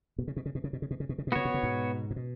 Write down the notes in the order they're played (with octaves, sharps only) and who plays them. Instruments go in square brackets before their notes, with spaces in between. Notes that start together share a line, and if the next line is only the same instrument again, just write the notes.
[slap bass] B2
C#3
B2
C#3
B2
C#3
B2
C#3
B2
C#3
B2
C#3
B2
[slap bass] C#3 [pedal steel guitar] B3 F#4 C#5
[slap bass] B2
C#3
G#2 B2
A#2
B2